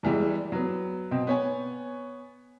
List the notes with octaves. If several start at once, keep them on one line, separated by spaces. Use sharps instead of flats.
E2 E3 G3 G#3
F#3 B3
B2 C4
B3 C#5 G#5